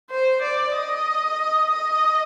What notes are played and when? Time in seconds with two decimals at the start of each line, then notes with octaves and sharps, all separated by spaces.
0.10 C5
0.42 D5
0.74 D#5
1.71 D#5